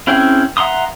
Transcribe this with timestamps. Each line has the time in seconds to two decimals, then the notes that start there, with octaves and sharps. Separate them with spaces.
0.07 C4 C#4 E4 G#4 G5
0.57 E5 F#5 A#5 C6 D#6